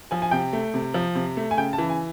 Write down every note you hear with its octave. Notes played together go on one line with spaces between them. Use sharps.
F3 G#5
G#5
C3 G5
A3
C3
F3
C3
A3
G#5
C#3 G5
A5
E3
G#5